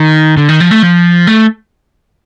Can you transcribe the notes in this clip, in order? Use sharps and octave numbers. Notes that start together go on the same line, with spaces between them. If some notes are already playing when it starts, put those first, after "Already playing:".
Already playing: D#3
D3
D#3
F3
A3
F3
A3